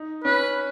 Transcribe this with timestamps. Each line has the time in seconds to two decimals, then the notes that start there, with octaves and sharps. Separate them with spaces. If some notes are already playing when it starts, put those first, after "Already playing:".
Already playing: D#4
0.24 C#4 B4